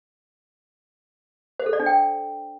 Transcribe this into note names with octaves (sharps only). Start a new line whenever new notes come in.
C5
A4
D5
D4
G5